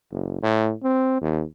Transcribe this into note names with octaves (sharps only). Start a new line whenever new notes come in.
F#1
A2
C4
D#2